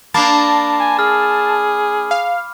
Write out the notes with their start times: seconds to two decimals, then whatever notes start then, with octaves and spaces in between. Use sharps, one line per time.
0.14 A#3 D4 A5 B5 D6 C7
0.80 G#5
0.99 G#4 F6
2.11 F5